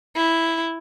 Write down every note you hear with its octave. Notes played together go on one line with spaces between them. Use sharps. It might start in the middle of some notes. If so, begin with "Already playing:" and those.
E4